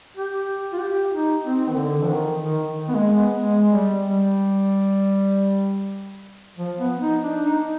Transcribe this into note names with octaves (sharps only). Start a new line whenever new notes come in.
G4
F4
G4
D#4
C4
D#3
D3
F3
D#3
D#3
B3
G#3
B3
G#3
G3
G3
F3
B3
D#4
D4
D#4